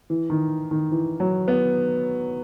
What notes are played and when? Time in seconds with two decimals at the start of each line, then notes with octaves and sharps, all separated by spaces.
0.10 E3
0.30 D#3
0.71 D#3
0.92 E3
1.20 F#3
1.48 B3